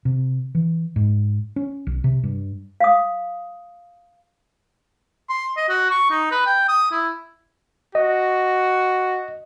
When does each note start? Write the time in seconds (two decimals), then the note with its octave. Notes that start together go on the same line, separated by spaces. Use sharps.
0.05 C3
0.55 E3
0.96 G#2
1.56 C#4
1.87 B1
2.04 C3
2.24 G2
2.80 F5 D#6
5.29 C6
5.57 D#5
5.69 F#4
5.90 C#6
6.10 D#4
6.31 B4
6.46 G5
6.68 D#6
6.91 E4
7.95 F#4 D#5